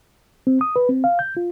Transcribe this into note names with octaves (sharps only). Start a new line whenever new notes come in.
C4
D#6
B4
C4
F5
G6
F4